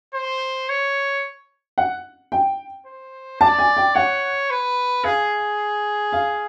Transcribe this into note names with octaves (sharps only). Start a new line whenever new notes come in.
C5
C#5
F#5
G5
C5
D5 A5
G#5
G5
C#5 F#5
B4
G#4 F5
F5